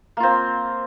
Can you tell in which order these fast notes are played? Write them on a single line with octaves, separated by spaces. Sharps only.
A#3 F4 C4